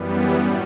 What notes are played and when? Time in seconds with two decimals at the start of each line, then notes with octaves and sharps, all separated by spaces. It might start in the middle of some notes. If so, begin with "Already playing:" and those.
Already playing: F#2 E3 G3 B3
0.32 A2 G3